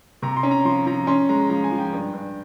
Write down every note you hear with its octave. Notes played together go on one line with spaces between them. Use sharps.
C3 A#5
C6
C#4
A#5
F3 C6
F3 A#5
C#4 C6
G#3 A#5
F3 A#5
G#5
F3
G5
G2
G2